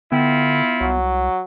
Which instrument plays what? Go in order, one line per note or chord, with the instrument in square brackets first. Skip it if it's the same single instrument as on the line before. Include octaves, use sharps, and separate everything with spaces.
[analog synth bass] D3 [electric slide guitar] B3 G5 [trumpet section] E4 F4
[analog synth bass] C2 [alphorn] F#3